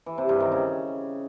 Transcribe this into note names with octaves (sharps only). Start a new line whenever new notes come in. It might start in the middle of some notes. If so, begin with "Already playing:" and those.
E3
C3
G2
D#3
C#3